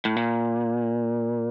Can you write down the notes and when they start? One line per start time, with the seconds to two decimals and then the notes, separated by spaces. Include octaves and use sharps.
0.05 A2
0.16 A#2